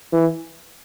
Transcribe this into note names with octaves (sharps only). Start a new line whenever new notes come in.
E3